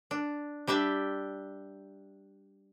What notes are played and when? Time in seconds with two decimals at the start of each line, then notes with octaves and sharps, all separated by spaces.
0.11 D4
0.67 G3 D4 G4 E5